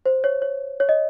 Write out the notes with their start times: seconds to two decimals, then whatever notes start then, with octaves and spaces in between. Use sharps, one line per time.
0.06 C5
0.24 C#5
0.42 C#5
0.80 C#5
0.89 D#5